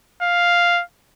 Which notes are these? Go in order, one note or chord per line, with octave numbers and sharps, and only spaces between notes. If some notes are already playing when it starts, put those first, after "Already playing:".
F5